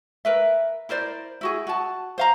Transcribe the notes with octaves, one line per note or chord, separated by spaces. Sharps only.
A#4 B4 E5
E4 A#4 C5 D5
E4 F#4 G#4
F#4 A5
C5 F5 A#5